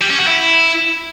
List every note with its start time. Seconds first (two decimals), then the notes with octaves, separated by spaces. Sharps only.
0.01 G3
0.10 C#4
0.18 F#4
0.27 E4